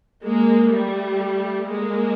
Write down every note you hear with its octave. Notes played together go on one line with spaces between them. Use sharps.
G#3 A#3
G3 A3
G#3 A#3